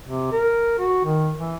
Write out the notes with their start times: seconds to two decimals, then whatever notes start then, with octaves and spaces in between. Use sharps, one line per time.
0.07 C3
0.32 A#4
0.79 F#4
1.04 D#3
1.38 E3